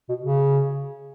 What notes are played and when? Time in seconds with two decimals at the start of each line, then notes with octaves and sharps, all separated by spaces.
0.09 B2
0.23 C#3